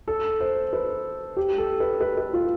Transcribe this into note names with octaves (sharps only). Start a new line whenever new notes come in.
A4
C5
B4
G4
A4
B4
B4
B4
F4